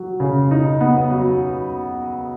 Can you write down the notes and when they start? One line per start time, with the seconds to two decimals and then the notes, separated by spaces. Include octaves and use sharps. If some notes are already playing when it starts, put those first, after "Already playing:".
Already playing: F#3
0.20 C#3
0.51 D#4
0.81 B3
1.10 F#3